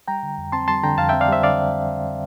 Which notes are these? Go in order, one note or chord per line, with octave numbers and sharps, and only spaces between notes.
G3 G5 A#5
D3
F2
C4 A5 C6
G3 A5 C6
D3 G5 A#5
F2 F5 A5
C4 E5 G5
D5 F5
G3 C5 E5
D3 D5 F5